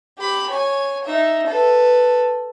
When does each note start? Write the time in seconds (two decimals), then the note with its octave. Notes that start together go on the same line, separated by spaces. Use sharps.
0.18 G4 B5
0.50 C#5 G#5
1.05 D#4 E5
1.47 A4 B4